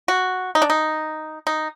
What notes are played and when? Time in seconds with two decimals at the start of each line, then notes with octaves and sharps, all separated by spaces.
0.08 F#4
0.55 D#4
0.62 D4
0.70 D#4
1.47 D#4